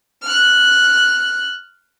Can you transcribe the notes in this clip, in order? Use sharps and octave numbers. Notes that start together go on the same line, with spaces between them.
F6 F#6